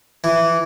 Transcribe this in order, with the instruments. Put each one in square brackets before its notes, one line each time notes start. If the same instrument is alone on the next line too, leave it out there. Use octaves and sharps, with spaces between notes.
[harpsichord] E3